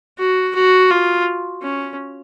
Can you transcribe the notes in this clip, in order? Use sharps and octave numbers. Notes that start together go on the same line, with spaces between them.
F#4
F#4
F4
C#4